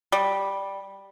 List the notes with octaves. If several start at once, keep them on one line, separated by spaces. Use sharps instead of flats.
G3